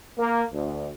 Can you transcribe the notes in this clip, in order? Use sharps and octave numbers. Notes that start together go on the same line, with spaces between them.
A#3
D2